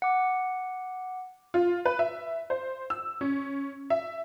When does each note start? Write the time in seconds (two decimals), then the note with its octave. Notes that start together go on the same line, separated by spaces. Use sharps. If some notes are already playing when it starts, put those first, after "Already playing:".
0.02 F#5 D6
1.54 F4
1.85 B4
1.99 E5
2.50 C5
2.90 E6
3.21 C#4
3.90 E5